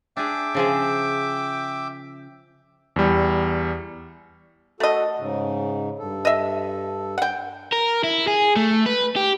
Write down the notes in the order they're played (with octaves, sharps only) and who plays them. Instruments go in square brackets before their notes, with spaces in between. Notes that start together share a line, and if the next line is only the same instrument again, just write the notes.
[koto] D4 G#4 [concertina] E5 G5 D6
[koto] C#3 F3 G#4
[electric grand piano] E2 G3
[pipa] A3 D#5 [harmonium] F#4 A4
[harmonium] G#2 C#3
G2 A4
[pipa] D#5 E5
F#5 G5
[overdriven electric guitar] A#4
E4
G#4
A3
B4
G4